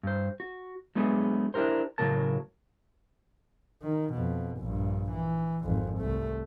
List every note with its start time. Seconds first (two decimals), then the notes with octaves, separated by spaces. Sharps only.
0.03 G2 C5
0.40 F#4
0.95 F#3 G#3 A3 B3 D4 G#4
1.54 D4 E4 G4 A#4 C5
1.98 A2 C#3 F#3 A3 A#4 A5
3.83 D#3
4.14 F2 B2
4.58 A#1 G2
5.12 E3
5.64 G#1 F2
5.99 C2 A3